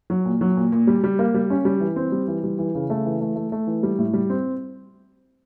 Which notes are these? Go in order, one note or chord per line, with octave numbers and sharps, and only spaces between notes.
F#3
A#2
F#3
A#2
A#2
G3
G3
A#3
G3
C#4
G3
E3
C4
G3
E3
G3
E3
C#3
A3
E3
A3
A3
A3
E3
G3
A2
G3
C4